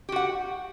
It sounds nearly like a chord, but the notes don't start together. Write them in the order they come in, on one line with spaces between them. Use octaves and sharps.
G4 F#4 F#5